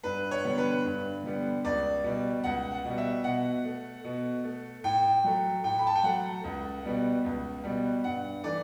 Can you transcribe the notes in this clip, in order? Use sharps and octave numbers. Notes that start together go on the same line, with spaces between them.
G2 B4
C#5
D3 G3 B3
B4
G2
D3 G3 B3
C#2 D5
B2 G3
C#2 F#5
F#5
B2 G3
E5
B2 F#5
A3
B2
A3
A2 G5
F#3 A3
A2 G5
B5
A5
G5
F#3 A3 F#5
C#2
B2 G3 B3
C#2
B2 G3 B3
G2 F#5
E3 A3 D5